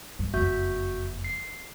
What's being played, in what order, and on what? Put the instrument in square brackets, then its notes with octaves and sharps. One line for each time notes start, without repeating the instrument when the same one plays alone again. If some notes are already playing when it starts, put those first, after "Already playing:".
[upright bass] G2
[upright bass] F#1 F2 [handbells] F#4 E5 G6
[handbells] C7